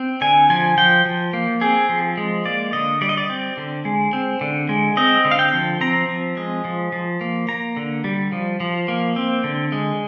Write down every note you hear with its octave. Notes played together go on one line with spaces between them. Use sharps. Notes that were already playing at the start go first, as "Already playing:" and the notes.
Already playing: C4
D3 G#5
F3 G#5
F3 G5
F3
A#3
C4 G#4
F3
G#3
A#3 D5
D3 D#5
G3 D5
D#5
D5
C4
D3
G#3
C4
D3
G#3
C4 D#5
D3
F5
G5
F3
C4 A#5
F3
G#3
F3
F3
A#3
A#3 A#5
D3
G3
F3
F3
A#3
C4
D3
G#3